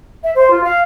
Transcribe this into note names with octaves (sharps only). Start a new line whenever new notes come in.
E5
C5
F4
F5